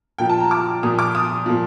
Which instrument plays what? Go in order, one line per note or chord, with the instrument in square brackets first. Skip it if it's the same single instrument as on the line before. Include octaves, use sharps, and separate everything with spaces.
[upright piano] A#2 F3 G5
A5
A#5
D6
A#2 F3 D#6
D6
D#6
A#2 F3